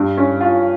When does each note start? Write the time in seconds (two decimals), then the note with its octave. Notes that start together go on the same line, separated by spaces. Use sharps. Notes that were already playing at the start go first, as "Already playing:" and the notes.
Already playing: G2
0.17 C#4
0.41 F4